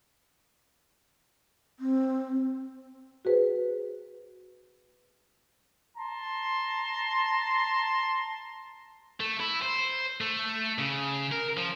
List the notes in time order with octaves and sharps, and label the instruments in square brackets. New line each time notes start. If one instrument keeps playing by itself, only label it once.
[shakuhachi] C4
[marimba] F#4 G#4 B4 C5
[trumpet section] A5 A#5 C6
[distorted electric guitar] A3
E4
C5
A3
C#3
A#4
F3